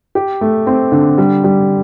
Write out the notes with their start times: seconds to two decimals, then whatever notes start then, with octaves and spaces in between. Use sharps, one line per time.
0.15 G4
0.41 A3
0.67 C4
0.92 D3
1.18 G3
1.44 G3